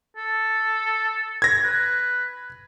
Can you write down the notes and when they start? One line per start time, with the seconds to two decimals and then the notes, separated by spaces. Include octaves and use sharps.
0.17 A4
1.42 G#6 A#6
1.63 B4